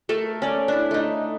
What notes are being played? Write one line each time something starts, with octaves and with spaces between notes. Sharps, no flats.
A3 A4 A#4
C#4 D5
D4 E4
A3 D#4